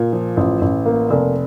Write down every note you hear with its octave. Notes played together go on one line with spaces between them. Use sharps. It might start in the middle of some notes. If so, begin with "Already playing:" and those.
Already playing: A#2
F3
A1
A1
A#3
F1